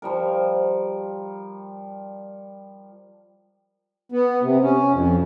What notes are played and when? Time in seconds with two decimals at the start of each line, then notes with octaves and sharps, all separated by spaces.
0.02 F3 G3 A#4
4.12 B3
4.43 C3
4.62 C#4
4.92 F2